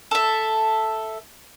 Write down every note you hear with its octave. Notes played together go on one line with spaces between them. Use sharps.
A4 E5